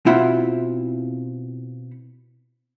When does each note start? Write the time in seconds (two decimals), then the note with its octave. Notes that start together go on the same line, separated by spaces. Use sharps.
0.06 B2 C4 E4 F4 F#5 B5